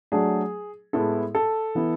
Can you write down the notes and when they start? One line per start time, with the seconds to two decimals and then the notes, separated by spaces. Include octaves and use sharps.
0.12 F#3 A3 D4 G#4
0.93 A2 G#3 B3 E4 A4
1.35 A4
1.75 E3 B3 E4